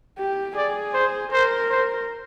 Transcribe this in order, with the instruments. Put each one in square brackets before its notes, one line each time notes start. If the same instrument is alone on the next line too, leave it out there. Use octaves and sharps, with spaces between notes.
[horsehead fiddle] G4
[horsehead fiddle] G#4 [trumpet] D5
[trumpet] C5
[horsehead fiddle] A#4 [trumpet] C5
[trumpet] C5